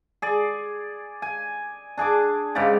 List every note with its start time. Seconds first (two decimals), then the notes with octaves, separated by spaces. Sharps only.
0.22 G#4 D5
1.22 G#5
1.98 D4 G#4 G#5 D6
2.55 G#2 C#3 G4 D5